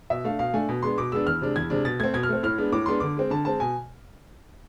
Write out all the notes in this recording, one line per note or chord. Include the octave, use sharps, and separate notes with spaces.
B2 E5
A3 D4 F5
B2 F5
A3 D4 G#5
B2
G#3 B3 D4 C6
B2 D6
G#3 B3 D4 E6
E2 F6
C3 G#3 D4
E2 G#6
C3 G#3 D4
B2 A6
A3 C4 G#6
B2 G#6
F6
A3 C4
A2 F6
G#3 B3 D4
A2 D6
G#3 B3 D4 C6
D3 D6
G#3 C4
D3 A5
G#3 C4 A5
B2 G#5